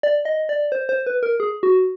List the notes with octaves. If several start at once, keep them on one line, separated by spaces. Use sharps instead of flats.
D5
D#5
D5
C5
C5
B4
A#4
G#4
F#4